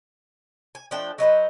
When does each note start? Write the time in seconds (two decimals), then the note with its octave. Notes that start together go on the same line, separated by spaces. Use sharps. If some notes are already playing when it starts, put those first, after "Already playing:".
0.75 G#5
0.91 F3 A3 D4 G5
1.18 F#3 D#4 B4 C5